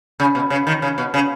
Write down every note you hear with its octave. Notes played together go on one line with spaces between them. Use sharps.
C#3
B2
C#3
D#3
C#3
B2
C#3